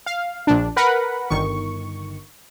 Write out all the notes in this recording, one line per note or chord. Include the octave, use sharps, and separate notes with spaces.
F5
A#1 D4
A#4 B4 F#5 B5
G1 D#3 C#6